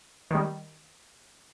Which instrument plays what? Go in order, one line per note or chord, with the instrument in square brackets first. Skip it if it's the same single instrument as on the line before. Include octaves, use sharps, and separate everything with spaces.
[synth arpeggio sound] D#3 G3